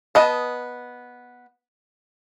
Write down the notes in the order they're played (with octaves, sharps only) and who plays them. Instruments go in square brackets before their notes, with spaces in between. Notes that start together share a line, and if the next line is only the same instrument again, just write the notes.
[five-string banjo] B3 D#5 A5